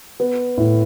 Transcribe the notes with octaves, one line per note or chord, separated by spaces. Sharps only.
B3
A2